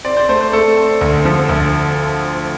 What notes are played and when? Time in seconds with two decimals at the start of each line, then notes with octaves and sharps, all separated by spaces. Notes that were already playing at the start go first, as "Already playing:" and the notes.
0.05 C4 D5
0.17 C5
0.29 A3 C5
0.41 C5
0.53 A3 A4
0.77 C4
1.01 D2
1.25 F3
1.49 D2